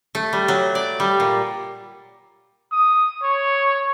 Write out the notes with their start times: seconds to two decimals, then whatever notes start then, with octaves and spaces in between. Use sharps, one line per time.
0.15 A3
0.33 G3
0.48 F#3
0.75 D5
1.00 G3
1.20 A#2
2.72 D#6
3.23 C#5